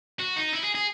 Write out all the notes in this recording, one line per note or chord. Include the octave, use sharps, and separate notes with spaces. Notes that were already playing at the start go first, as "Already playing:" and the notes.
F#4
D#4
E4
G#4
G#4